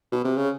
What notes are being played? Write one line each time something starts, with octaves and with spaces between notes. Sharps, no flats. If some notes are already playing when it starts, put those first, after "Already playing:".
B2
C3
C#3